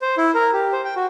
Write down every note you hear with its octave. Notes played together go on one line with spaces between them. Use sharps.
C5
E4
A#4
G4
C5
G5
F#4